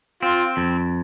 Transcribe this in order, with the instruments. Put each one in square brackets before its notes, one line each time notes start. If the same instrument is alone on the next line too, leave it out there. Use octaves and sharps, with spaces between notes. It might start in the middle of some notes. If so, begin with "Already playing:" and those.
[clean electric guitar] C4 [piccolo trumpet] F4
[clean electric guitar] F2